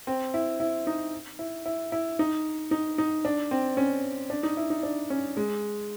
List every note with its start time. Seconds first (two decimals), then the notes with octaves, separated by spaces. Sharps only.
0.07 C4
0.34 E4
0.60 E4
0.87 D#4
1.39 E4
1.66 E4
1.92 E4
2.19 D#4
2.71 D#4
2.98 D#4
3.25 D4
3.51 C4
3.77 C#4
4.30 D4
4.43 D#4
4.57 E4
4.70 D#4
4.83 D4
5.10 C#4
5.37 G#3